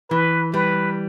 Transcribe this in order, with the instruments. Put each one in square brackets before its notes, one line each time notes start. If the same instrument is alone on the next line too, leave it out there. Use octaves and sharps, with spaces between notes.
[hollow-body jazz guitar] E3 [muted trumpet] B4
[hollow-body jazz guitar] G3 [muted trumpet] B4